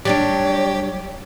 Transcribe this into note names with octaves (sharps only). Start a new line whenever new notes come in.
F#3 G3 D4 G4 C#5 G5 A6